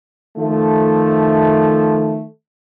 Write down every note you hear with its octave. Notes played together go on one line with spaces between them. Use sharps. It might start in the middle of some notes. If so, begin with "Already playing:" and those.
D#3 F3 A3